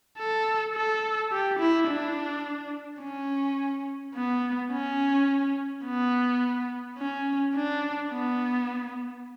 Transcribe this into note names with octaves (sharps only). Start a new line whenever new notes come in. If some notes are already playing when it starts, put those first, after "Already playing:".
A4
A4
G4
E4
D4
C#4
B3
C#4
B3
C#4
D4
B3